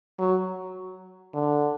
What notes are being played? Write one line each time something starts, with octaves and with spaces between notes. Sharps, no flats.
F#3
D3